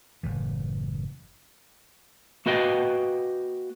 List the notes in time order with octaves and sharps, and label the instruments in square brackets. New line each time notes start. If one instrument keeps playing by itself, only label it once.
[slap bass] F#1 A2 E3
[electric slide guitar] A#3 F#4 B4 D#5 G5